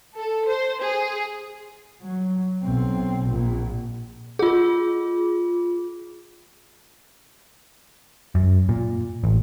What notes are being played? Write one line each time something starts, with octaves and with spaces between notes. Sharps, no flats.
A4
C5
G#4
F#3
B1 C4
A#1 A#2
F4 G#4
F#2
A#2
A1